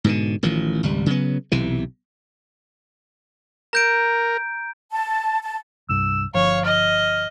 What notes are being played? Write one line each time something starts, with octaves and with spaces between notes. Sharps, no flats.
G#2 B2 D3
A1 D#3 F3
G#1 C#2 G3
C#3 F#3 B3
B1 C3 E3
A#4 A#5 G6 D7
A5
A5
C2 G2 E6
G1 F3 C#5 F5
D#5 F6